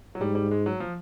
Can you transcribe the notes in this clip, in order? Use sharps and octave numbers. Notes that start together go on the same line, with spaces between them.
F#3
G#2 G3
G3
G#3
F#3
F3